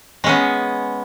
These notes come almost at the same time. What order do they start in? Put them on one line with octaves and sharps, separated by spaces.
G#3 C#4 B3